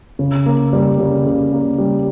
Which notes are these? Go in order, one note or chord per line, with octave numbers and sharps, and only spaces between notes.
C#3
A#3
G3
C#3
C#3
A#3
G3